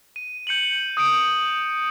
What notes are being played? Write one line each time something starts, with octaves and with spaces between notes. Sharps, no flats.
D#7
G6 C#7 D#7 F#7
D#6 G6 C#7 D7